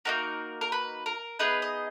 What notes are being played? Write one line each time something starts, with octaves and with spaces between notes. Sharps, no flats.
A#3 D#4 F#4 A#4
A#4
B4
A#4
B3 D#4 G#4 B4
D#5